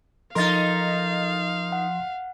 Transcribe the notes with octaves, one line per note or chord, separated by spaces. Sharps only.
F3 D#4 A4 A#4 D#5 F5 C6 A6
F#5